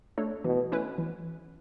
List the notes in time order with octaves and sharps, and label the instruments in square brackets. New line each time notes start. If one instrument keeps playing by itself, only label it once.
[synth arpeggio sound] A3 D4 A4 C#5
[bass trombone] B2 [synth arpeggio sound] E3
[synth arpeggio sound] A3 C#4 E4 B4
E3